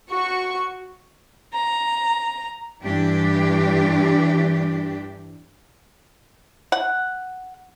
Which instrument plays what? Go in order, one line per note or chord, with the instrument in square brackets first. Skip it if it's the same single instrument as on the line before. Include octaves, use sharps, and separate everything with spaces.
[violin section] F#4 C#6
[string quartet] A#5
[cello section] G2 E3 D4 G4
[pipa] F#5